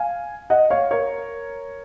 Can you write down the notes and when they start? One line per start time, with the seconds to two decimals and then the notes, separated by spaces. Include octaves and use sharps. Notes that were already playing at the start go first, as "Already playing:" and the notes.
Already playing: F5 G#5
0.50 D#5 F#5
0.70 C#5 F5
0.91 A#4 C#5